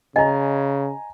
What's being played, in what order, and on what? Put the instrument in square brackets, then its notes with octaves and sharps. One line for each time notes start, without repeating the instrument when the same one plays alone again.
[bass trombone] C#3 [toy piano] D#5 [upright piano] G#5 A#5